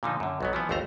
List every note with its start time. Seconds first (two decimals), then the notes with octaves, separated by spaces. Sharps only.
0.03 A#2 D3 F3 D#4
0.20 F#2 D3
0.41 B1 F#3 B3
0.53 E3 F3 B3
0.69 G#1 D#2 A3 C5 A#5